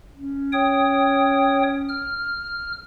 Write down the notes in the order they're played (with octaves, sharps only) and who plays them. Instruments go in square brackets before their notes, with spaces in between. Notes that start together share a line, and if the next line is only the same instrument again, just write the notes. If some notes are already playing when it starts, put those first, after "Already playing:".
[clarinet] C#4
[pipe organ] C#5 G5 D#6
F6